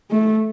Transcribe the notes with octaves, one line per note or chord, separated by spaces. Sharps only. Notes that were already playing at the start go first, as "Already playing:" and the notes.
A3